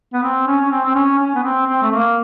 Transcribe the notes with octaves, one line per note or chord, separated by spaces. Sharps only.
B3
C4
C#4
C#4
C4
C4
C#4
C#4
B3
C4
C4
A3
A#3